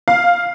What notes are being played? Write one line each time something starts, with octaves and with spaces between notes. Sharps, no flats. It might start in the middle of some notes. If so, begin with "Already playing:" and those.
F5